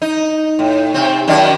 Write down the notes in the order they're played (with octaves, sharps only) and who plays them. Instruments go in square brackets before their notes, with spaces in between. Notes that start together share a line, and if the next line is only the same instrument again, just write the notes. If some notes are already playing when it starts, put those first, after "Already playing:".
[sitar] D#4
A2
C3 C4
F#2 D#3 D5